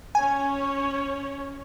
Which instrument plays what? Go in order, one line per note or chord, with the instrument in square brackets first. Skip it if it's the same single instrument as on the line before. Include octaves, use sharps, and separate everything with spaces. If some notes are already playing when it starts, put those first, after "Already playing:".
[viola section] C#4 C#5 [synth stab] G#5